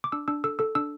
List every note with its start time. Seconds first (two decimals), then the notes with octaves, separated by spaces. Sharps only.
0.04 D6
0.12 D4 E6
0.28 D4 E6
0.44 A4 E6
0.59 A4 E6
0.75 D4 E6